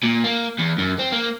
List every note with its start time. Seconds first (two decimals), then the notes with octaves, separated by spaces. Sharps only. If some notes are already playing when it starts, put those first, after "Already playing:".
0.04 A#2
0.24 A#3
0.59 E2
0.78 F#2
0.99 C4
1.12 A#3